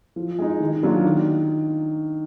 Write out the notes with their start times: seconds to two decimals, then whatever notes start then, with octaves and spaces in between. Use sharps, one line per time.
0.16 F3
0.39 G#3 D#4
0.60 D#3
0.83 F#3 A#3 D4 F4
1.05 D#3